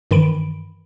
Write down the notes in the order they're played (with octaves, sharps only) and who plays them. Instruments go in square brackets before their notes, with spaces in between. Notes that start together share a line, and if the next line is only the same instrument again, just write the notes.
[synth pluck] G2 D#3 E3 B5 D7